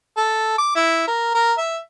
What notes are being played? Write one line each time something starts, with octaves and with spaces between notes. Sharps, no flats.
A4
D6
E4
A#4
A#4
E5